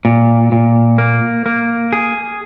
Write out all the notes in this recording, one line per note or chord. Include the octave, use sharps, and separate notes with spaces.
A#2
A#2
A#3
A#3
G#4